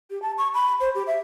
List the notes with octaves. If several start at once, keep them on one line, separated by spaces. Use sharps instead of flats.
G4
A5
C#6
B5
C5
G4
E5